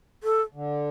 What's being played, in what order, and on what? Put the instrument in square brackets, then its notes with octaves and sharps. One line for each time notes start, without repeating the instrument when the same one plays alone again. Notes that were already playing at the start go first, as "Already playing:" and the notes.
[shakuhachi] A4
[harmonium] D3